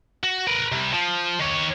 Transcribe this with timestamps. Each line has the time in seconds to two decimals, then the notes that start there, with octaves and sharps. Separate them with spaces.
0.24 F#4
0.47 A#4 B4
0.72 C3 G3
0.93 F3
1.39 D#3 C#5